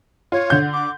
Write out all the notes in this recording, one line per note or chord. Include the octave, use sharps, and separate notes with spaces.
F4 C#5
D3 G6
D6